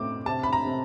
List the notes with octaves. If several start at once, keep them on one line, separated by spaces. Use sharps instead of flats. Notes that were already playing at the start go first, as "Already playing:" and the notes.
Already playing: A2 C4 D6
C3 A5
B5
A#5
C3